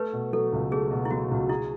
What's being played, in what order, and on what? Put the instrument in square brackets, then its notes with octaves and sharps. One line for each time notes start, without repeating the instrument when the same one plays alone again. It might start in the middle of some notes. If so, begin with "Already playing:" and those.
Already playing: [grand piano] A3 [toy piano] B4
[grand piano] B2
[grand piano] F#3 [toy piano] A4
[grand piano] C#2
[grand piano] A3 [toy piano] G#4
[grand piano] B2
[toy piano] E4
[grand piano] F#3 [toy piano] F#4
[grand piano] C#2
[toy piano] E4 [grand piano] G#4